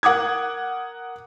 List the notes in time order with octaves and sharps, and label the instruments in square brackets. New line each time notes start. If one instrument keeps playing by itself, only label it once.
[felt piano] A#4 F#5 D6 D#6 G#6